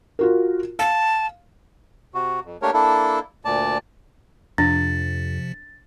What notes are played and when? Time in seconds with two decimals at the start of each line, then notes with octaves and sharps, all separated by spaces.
0.19 F4 F#4 A#4
0.79 F5 A5
2.14 C3 F#4
2.45 F2
2.62 A3 A#3 D4 G4 A#4 C#5
2.74 A#3 D4 E4 A4
3.45 D2 A#2 D5 A5
4.58 F2 C3 F3 D4 A6